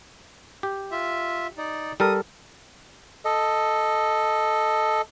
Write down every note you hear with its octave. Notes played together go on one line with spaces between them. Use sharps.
G4
F4 E5
D#4 D5
G3 A4 A#4 D#6
A4 D#5